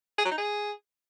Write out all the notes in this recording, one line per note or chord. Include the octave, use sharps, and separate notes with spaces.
G#4
F#3
D#4
G#4